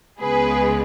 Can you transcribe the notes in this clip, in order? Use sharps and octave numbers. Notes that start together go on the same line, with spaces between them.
C#2 C#3 G#3 B3 G#4 B4